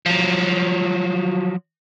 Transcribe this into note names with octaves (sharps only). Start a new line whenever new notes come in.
F3 F#3